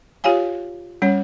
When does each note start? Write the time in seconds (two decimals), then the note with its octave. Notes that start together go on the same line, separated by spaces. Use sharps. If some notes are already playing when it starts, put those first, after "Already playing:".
0.24 F4 G4 C#5 F5 G#5
1.02 G3 C#4 C#5